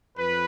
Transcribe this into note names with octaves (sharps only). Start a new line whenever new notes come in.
F2 B4